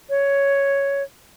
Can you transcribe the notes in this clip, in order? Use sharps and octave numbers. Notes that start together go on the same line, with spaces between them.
C#5